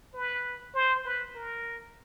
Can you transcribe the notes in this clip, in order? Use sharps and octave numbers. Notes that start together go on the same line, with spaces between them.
B4
C5
B4
A#4